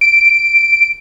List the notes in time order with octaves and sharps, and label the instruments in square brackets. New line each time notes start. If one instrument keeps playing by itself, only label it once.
[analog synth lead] D7